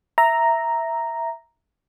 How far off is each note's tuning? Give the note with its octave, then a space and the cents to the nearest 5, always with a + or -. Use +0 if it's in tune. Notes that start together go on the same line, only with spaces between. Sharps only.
E5 +0 A#5 +0